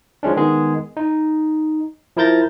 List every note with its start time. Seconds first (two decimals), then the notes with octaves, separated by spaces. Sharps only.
0.23 F3 G#3 C#4 D4
0.37 D#3 G#3 B3 G#4
0.97 D#4
2.17 F3 E4 A#4 G6 A6 A#6